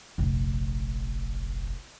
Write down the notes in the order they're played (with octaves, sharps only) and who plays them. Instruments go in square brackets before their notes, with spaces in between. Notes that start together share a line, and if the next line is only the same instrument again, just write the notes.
[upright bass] F1 A#1